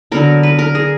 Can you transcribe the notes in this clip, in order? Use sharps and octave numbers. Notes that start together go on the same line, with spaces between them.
D3 F#3 B3 A#4
B4
A#4
G#4